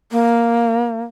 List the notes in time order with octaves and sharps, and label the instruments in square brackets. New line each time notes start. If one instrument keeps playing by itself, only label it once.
[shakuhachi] A#3